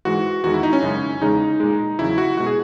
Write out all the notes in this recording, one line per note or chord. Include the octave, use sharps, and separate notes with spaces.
G#2 E3 G#3 F#4
E2 D#3 G#3 F#4
E4
D#4
C#4
F#2 C#3 G#3
E2 C#3 G#3 D#4
A#2 G#3
E2 C#3 F#3 E4
F#4
B2 G#3 F#4
G#4